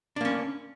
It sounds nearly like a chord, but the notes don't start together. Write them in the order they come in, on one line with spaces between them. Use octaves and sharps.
D4 A#3 C#4